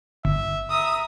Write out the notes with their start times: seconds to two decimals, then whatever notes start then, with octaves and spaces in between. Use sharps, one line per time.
0.25 G1 E5
0.70 E5 A#5 D#6 E6